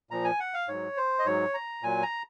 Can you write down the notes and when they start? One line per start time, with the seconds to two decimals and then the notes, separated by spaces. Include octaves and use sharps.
0.11 A#2 F3 A#5
0.24 G#5
0.40 F#5
0.54 F5
0.68 G#2 F#3 C#5
0.97 C5
1.19 D#5
1.25 G#2 F#3 C#5
1.54 A#5
1.83 A#2 F#3 G#5
2.02 A#5